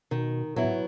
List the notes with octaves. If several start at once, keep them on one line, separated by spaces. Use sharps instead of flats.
B2 D#3
A#2 F#3 B3 E4
A2